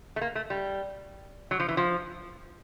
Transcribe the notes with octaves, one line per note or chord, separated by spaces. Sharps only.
A3
A#3
A3
G3
F#3
F3
E3
F3